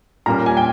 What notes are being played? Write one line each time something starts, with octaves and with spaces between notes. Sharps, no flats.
A#2 G3 A#3 C#4 A#5
G#5
G5